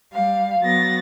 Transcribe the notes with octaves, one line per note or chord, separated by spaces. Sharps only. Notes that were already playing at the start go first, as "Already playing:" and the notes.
G3 F5
F#3 B3 A6 A#6